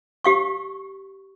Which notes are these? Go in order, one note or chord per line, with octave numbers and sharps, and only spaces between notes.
G4 F5 C#6